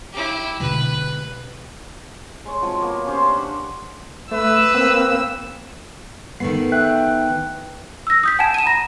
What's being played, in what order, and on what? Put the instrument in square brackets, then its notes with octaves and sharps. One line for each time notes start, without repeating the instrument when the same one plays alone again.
[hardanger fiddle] E4 G4
[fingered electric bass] B2 D3 G#3 [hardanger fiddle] B4
[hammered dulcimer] G#3 C#5
F3 F#3 C4
A#3 B3
C#4 G4 C5 C6
D4 F#5
[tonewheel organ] A3 [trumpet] B4 [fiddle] E6
[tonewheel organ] A#3 C4
[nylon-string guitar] D#3 A3 B3 [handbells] C7
[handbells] E5 G5 F#6
[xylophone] E6 A#6
D#6 G6 B6
F#5 G#5 A5 G#6 E7
D#7 E7
A#5 B5 A#6